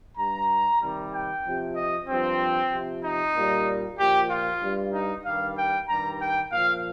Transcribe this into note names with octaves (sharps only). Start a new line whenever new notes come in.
G2 G3 A#5
C3 D#3 G3
G5
C3 F3
D#5
G2 F3 C4
C3 F3
D#4
A#2 G3
A#2 F3 G4
F4
G2 G3
D#4
G2 D#3 G3 F5
G5
G2 D#3 G3 A#5
G5
A#2 F3 F5